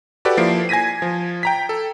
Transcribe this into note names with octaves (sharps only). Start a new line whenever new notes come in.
F#4 G4 A4 B4 D5
F3 A#3 E4 C7 D7
G#5 G#6 A#6 B6 D#7
F3
G5 A#5 B6
A4